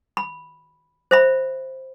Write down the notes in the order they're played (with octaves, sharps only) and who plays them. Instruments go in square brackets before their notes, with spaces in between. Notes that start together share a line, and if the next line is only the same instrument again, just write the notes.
[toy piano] B5
C5 E5 B5